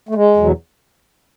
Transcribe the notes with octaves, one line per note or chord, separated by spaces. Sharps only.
A3
G#3
E2 B2 F#3